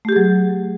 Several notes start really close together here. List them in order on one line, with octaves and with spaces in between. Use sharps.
A3 G4 G#4 F#3